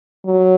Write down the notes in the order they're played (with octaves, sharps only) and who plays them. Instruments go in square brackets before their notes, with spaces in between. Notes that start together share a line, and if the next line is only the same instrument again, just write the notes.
[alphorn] F#3